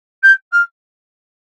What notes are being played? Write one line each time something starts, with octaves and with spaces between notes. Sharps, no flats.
G6
F6